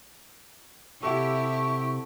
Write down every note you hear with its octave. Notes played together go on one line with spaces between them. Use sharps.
C3 E4 G4 A4 E5 F#5 C#6